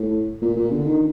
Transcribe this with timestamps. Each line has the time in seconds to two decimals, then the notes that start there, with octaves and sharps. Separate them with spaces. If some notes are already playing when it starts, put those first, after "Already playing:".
Already playing: A2
0.42 A#2
0.56 A#2
0.71 D3
0.86 D#3